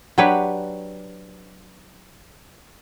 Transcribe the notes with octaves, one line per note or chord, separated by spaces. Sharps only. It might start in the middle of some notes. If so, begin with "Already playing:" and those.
F#3 D4 G4 B4 C#5